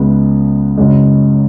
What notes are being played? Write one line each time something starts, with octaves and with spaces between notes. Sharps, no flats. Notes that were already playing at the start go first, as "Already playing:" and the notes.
Already playing: C#2 C#3 G#3 B3
F#1 F#2 C#3 G#3